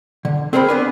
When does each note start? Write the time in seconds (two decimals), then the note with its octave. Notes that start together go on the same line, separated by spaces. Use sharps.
0.25 D3
0.53 C4 G#4 A#4 C5 F#5 B5
0.68 B3 D4 G#5